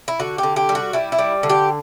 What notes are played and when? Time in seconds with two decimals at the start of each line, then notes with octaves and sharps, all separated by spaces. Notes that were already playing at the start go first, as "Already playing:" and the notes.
0.08 E4
0.20 D3 F#4
0.38 G4
0.43 D3
0.56 G4
0.69 G3
0.75 F#4
0.93 G3 E4
1.12 E4
1.19 G3
1.43 D3
1.50 G4